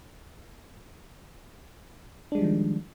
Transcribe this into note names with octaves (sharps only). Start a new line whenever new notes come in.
D#3 F3 G3 G#3 D4